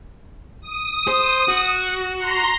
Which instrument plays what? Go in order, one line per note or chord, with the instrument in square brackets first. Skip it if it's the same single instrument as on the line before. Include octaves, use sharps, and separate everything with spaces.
[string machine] D#6
[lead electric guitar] C5
F#4
[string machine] A#5 C6 A#6